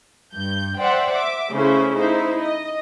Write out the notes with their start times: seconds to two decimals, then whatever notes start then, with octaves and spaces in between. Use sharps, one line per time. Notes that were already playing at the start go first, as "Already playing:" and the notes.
0.35 G2 G6
0.79 C5 D5 E5 F#5 G5
1.12 E5 D6
1.52 C#3 A3 C#4 E4 C5
1.97 D#4 E4 C5
2.43 D#5